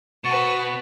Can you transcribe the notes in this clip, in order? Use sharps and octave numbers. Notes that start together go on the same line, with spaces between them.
B2 F#4 B4 C#6 A6 C#7 E7